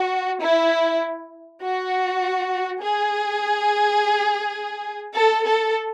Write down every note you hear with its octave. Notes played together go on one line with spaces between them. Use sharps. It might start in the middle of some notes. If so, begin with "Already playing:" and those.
Already playing: F#4
E4
F#4
G#4
A4
A4